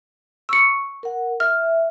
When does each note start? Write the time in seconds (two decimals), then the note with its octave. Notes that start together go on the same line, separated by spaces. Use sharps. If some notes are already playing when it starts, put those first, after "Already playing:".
0.49 C#6 E6 C#7
1.03 A#4 F#5
1.40 E5 F6